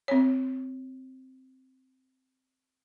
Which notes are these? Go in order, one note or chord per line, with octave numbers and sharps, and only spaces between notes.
C4 C#5